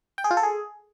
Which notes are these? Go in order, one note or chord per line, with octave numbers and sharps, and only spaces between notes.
G5
G#4
F4
A4
G#4